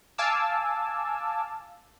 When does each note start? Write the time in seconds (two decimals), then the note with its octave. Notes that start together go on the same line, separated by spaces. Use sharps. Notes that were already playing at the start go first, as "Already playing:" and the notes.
0.18 F5 G#5 A5 D6 E6